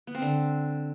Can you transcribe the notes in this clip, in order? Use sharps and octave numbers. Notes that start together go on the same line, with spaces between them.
B3
C4
D3